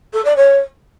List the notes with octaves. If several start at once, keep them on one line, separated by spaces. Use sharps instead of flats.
A4
D5
C#5